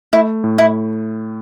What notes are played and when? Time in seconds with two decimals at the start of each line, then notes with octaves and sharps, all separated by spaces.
0.13 A3 E4
0.44 A2
0.58 E4